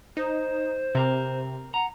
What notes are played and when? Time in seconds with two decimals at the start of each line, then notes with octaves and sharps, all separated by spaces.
0.17 D#4 C5
0.95 C3 C4 A#4
1.74 F#5 A#5